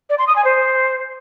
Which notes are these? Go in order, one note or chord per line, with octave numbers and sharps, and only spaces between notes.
D5
C6
D#6
G#5
C5